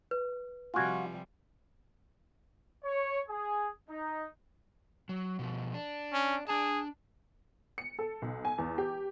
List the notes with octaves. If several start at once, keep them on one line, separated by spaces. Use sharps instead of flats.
B4
C3 F3 G3 F4 F#4 G#5 G#6
C#5
G#4
D#4
F#3
B2 F3
D4
C#4
D4 G#4 A5
C#7
A4
B1
G#5
E2
G4